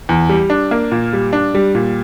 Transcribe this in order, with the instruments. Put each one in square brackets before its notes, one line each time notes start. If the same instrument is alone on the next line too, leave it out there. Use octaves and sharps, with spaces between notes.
[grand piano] E2
G3
D4
A#3
A#2
G3
D4
G3
A#2